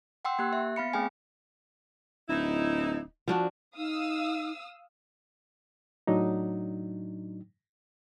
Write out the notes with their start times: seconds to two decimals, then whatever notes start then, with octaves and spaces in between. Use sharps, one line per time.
0.25 F#5 G5 C6 E6
0.39 A#3 G4 F#6
0.53 E5
0.76 B3 F5 B5 C#7
0.93 A3 C4 G#4 G5 G#5
2.29 D1 D#4 E4
3.28 F3 D4 F#4
3.77 D#4 F5 D#6 E6
6.07 A2 F#3 D4 D#4